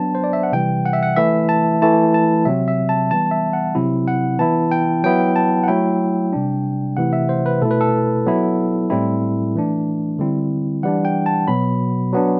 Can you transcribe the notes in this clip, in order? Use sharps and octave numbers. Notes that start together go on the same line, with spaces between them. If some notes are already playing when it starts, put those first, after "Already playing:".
Already playing: F#3 B3 D4 A5
C5
D5
E5
F#5
C3 E3 G3 G5
F#5
E5
F#5
E3 A3 E4 E5
A5
E3 A3 E4 A5
A5
C3 F#3 C4 E5
E5
A5
E3 G3 B3 A5
E5
F#5
C3 F#3 C4 E4
F#5
E3 B3 E4 A5
G5
F#3 B3 E4 G5
A5
F#5
F#3 A3 E4 G5
C3 G3 D4
C3 E3 A3 E4 F#5
E5
C5
B4
B2 A3 E4 A4
B4
A4
F#3 B3 E4
A2 G3 C4 E4
E3 A3 D4
D3 G3 C4 E4
E3 G3 D4 F#5
G5
A5
B2 F#3 B3 B5
F#3 B3 D4